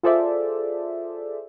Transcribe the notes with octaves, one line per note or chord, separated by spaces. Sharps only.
F4 G#4 A4 C5 D5 E5